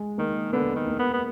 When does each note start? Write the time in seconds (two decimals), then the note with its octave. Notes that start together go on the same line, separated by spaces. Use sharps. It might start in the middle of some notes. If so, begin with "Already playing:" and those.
Already playing: G#3
0.18 D#3 A#3
0.53 D3 B3
0.76 D#3
0.87 A#3
0.99 B3
1.13 B3